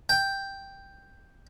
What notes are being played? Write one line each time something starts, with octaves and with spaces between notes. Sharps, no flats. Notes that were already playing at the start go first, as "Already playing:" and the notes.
G5